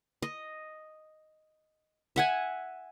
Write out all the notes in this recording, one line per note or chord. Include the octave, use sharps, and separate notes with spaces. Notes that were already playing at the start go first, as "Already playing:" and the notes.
D#5
E5 F#5 G#5